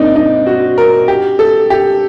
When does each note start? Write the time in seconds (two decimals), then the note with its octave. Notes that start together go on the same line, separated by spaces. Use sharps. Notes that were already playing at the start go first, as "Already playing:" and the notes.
Already playing: A#3 C4 D4 D#4
0.16 D#4
0.46 F#4
0.78 A#4
1.08 G4
1.39 A4
1.70 G4